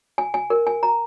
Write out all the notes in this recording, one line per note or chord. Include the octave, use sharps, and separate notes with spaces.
G#5
G#5
A#4
G#5
A#5